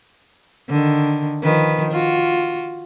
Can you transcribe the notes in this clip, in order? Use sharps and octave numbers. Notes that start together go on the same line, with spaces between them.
D3 D#3
D#3 F3 B4
F4 F#4